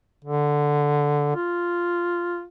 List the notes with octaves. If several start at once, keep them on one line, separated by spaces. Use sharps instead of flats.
D3
F4